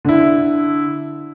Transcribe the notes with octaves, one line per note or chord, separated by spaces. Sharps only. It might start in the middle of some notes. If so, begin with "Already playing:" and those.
D3 E4